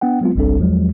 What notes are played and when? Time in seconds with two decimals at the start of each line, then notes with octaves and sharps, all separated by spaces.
0.01 B3 D4 F#5 G5
0.21 F#3 G#3 B3 C4 F4
0.35 G1 C2 G3 C4 D4 A4
0.59 E2 F3 F#3 G#3